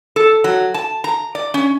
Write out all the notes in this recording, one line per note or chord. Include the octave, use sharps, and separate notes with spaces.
A4
F#3
A5
A#5
D5
C#4